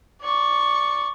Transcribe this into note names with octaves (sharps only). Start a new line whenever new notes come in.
D5 C#6